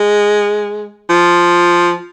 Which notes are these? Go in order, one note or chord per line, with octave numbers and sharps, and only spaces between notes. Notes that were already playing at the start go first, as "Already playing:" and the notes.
Already playing: G#3
F3